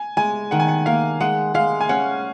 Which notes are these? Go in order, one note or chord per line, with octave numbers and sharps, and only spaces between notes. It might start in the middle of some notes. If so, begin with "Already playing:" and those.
Already playing: G#5
G#3 G#5
D#3 F#5
G#5
F#5
A#3 F5
G#3 F#5
G#3 F5
G#5
C#4 F#5